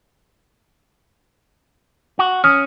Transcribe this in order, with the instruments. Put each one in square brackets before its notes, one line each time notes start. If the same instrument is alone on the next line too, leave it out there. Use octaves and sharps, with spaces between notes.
[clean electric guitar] F#4
[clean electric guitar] C#4 [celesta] D#6 F6